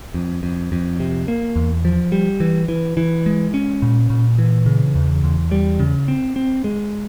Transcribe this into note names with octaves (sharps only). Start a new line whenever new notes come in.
F2
F2
F2
C3
A#3
E2
F3
G3
E3
E3
E3
G#3
C#4
A#2
A#2
E3
C#3
E2
E2
G3
C#3
C4
C4
G#3